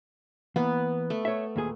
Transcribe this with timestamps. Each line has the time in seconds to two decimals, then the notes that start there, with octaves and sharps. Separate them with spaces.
0.56 E3 A#3 B3
1.10 A3
1.25 C#5 E5
1.56 D#2 A#2 G#4